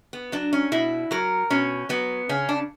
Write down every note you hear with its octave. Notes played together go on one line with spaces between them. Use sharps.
B3
F#3 D4
C#4
B2 E4
F#3 A#4
B2 C#4
F#3 B3
C#3 C#4
D4